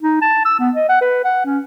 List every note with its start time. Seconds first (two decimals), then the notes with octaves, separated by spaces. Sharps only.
0.01 D#4
0.22 A5
0.45 E6
0.59 B3
0.75 D#5
0.89 F#5
1.01 B4
1.24 F#5
1.45 C#4